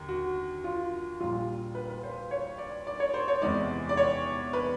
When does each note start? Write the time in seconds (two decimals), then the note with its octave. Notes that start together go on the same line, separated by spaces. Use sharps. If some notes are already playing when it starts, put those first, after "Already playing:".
Already playing: D#2 D3
0.09 F#4
0.64 F4
1.20 A#1 A#2 G3 F4
1.75 B4
1.90 B4
2.03 C5
2.31 C#5
2.58 D5
2.87 D5
3.00 C#5
3.14 C5
3.28 C#5
3.42 E2 C3 E3 G#3 D5
3.89 D5
3.97 C#5
4.53 B4